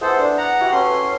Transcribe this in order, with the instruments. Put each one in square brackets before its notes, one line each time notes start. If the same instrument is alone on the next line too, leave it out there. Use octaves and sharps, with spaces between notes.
[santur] B3 E4 G#4 [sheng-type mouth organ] A4 C5
[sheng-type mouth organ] D4 [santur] E6
[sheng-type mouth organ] F#5 A#5
[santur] E4 F#4 G4
[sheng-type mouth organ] C#4 C6 [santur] A4 B4